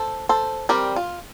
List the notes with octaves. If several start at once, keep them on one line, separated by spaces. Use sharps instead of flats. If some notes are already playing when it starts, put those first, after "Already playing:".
Already playing: A4 C5
A4 C5
G3 C4 G4 A#4
F4